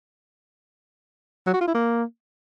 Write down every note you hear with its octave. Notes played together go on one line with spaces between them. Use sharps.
F#3
F#4
F4
E4
A#3